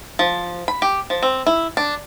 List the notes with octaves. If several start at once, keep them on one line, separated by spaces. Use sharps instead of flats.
F3
B5
G4
F3
C4
E4
D4